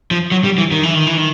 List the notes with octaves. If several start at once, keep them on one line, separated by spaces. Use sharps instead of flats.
F3
F#3
G3
E3
D#3
E3
D#3
E3
D#3